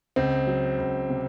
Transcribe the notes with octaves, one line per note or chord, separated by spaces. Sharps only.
C#2 C4
F#3
C#2
C3